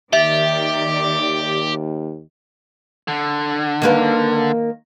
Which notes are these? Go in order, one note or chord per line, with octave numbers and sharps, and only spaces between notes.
D#2 D#3 G4 D5 E5
D3
D#3 A#3 B4